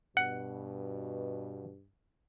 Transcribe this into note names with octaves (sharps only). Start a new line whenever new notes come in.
G2 B2 F#5